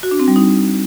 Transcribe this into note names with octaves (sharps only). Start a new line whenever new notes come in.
F#4
D4
C4
G3
D#4